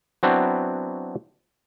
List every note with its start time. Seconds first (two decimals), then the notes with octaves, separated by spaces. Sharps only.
0.23 F#3 B3 C4 D4 E4 F#4